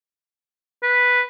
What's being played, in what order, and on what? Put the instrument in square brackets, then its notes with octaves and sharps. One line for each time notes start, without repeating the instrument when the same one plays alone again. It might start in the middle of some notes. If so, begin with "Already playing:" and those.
[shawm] B4